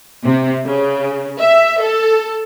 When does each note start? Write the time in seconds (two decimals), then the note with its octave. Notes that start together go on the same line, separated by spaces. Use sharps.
0.24 C3
0.65 C#3
1.39 E5
1.81 A4